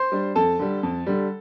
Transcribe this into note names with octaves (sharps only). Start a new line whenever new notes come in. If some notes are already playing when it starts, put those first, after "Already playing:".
Already playing: C5 C6
G3 D4
F2 A4 A5
D3 G3
F2
D3 G3